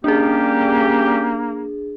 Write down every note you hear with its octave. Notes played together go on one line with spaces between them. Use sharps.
G3 A#3 C#4 D4 G4 G#4